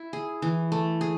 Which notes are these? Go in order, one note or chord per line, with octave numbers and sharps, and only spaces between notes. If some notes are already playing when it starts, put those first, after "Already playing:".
Already playing: E4
G#4
E3
A3
G#4